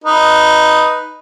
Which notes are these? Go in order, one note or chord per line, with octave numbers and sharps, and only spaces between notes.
D#4 B4